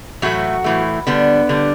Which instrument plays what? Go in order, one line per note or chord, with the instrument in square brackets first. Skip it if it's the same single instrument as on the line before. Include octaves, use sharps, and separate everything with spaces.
[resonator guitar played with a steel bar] A2 E3 F#3 A3 F#4
A2 E3 A3
D3 G3 B3
D3 G3